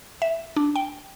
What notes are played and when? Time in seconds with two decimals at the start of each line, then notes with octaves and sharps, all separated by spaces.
0.22 E5
0.56 D4
0.76 G5